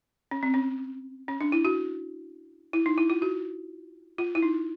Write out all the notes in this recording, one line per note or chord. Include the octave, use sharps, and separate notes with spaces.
C#4
C4
C#4
C#4
D4
E4
F#4
E4
D#4
E4
F4
F#4
F4
E4
D#4